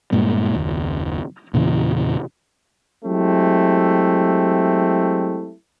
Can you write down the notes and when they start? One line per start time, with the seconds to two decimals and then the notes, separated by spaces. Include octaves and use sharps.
0.12 G2 A#2 G#3
0.55 F#1 D#2
1.54 E2 A#2 C#3 E3
3.05 F#3 G#3 A3 C4 E4 G4